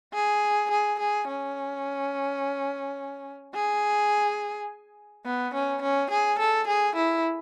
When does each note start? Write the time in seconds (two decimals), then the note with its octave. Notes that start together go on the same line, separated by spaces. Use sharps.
0.14 G#4
0.71 G#4
0.99 G#4
1.27 C#4
3.55 G#4
5.26 B3
5.54 C#4
5.82 C#4
6.10 G#4
6.39 A4
6.67 G#4
6.95 E4